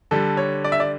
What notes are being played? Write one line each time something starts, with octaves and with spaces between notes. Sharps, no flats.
D3 G3 D4 A4
C#5
D5
E5
D5